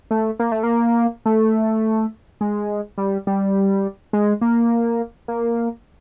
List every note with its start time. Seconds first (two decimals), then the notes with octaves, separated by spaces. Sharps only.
0.11 A3
0.39 A#3
0.52 A3
0.63 A#3
1.26 A3
2.41 G#3
2.98 G3
3.27 G3
4.13 G#3
4.41 A#3
5.28 A#3